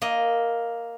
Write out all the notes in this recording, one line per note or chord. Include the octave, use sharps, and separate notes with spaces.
A#3 D#5